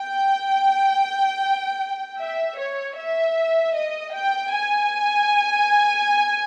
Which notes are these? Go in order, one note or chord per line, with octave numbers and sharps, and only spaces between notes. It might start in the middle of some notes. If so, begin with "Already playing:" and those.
Already playing: G5
E5
C#5
E5
D#5
G5
G#5